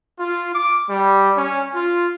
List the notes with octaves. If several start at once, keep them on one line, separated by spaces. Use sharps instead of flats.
F4
D6
G3
C#4
F4